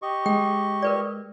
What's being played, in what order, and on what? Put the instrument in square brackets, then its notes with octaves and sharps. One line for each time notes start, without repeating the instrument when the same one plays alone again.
[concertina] G4 D#5 C#6
[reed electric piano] G#3 [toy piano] G5
[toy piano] A#4 B4 D5